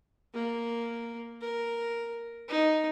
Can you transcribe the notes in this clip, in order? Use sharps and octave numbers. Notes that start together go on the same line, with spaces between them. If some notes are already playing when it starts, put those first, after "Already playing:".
A#3
A#4
D#4